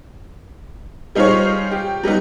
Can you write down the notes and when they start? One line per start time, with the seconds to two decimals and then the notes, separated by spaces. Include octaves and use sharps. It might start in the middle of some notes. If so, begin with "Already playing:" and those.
1.15 G3 D#4 F4 G#4 C5 C#5
1.72 G4
2.03 F#3 G3 B3 D#4